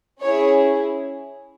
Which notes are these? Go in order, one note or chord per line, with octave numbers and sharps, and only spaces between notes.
C#4 E4 G#4 C#5